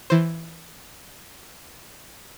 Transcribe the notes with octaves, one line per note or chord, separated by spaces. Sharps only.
E3 C5